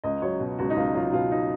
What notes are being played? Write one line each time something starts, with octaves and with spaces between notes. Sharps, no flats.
C#2 D#5
F#3 C#5
B2
C#2 F#4
D#4
C#2 F4
F#3 F4
D#4
B2 F4
D#4